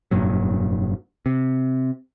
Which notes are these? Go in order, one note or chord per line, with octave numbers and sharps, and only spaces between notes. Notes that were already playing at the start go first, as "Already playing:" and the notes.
F1 G2 A#2 F#3
C3